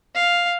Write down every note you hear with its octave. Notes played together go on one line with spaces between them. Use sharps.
F5